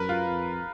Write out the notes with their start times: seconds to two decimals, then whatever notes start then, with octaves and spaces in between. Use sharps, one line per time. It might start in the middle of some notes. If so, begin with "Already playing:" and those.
Already playing: F#2 A#4 B4
0.09 F4
0.27 F2